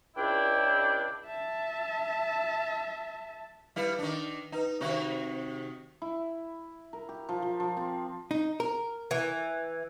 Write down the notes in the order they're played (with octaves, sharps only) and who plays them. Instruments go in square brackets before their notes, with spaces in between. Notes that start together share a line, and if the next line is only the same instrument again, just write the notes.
[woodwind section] C#2 D4 E4 G5
[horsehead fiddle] E5 A5
[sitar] G3 E4 [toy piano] B4 F5
[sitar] D#3 D4
[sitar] D#4 [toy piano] B4 G5 A#5
[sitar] C3 D#3 F#4
[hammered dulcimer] E4
A#4
G4
F3
F3
F3
C4
[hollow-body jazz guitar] D#4
A#4
[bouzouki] E3